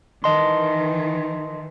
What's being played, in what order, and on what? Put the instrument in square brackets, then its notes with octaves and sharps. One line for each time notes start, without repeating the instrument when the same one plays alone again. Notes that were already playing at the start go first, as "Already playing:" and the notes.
[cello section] D#3 E3 [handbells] D#5 A5 C6